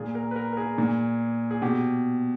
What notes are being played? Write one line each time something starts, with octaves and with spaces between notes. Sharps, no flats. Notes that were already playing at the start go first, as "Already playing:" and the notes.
Already playing: A#2 G#4
A#4
B4
A#4
A#4
G#4
A#2
G#4
B2 G4